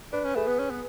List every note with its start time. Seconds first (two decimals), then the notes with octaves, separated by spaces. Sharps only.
0.12 D4 B4
0.24 C#4
0.35 A3 G#4 B4
0.47 B3
0.59 C#4
0.70 B3